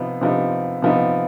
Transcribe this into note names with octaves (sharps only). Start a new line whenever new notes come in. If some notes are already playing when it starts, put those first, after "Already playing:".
Already playing: C3 F3 B3 D#4
C3 F3 B3 D#4
C3 F3 B3 D#4